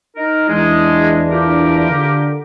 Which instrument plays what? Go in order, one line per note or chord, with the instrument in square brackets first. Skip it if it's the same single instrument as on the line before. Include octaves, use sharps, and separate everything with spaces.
[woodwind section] D#4 A#4
[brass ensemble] E2 D4 E4 [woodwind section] G#3
[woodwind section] F4 G4 A#4
[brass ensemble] D3